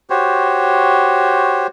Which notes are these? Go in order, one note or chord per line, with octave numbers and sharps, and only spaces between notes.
F#4 G4 C5 C#5